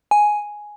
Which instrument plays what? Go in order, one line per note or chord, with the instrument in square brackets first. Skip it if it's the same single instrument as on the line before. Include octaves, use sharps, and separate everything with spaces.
[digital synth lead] G#5